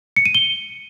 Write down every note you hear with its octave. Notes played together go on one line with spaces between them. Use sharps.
C#7
D#7
G7